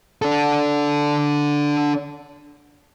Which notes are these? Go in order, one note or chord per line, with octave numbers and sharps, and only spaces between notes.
D4 A4